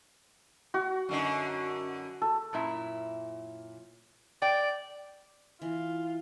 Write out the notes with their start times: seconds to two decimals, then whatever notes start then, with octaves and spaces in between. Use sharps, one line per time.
0.74 F#4
1.09 F#2 D3 D#4
2.22 A4
2.53 F#2 A#2 E4
4.42 D5 G5
5.62 E3 F4